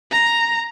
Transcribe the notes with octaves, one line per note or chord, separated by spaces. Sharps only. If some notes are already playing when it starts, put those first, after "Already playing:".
A#5